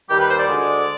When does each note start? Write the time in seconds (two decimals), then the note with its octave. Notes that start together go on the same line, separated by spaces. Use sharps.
0.10 D#2 D#3 G3 G4
0.19 B4
0.29 C5
0.38 D5
0.47 D2 D3 G#3